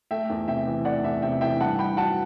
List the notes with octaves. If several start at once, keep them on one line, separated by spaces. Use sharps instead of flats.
A3 E5 G5
E2
C3 E5 G5
E3
A3 D5 F#5
E2 E5
C3 E5 G5
E3 E5 G5
G2 F#5 A5
G2 G5 B5
F#3 F#5 A5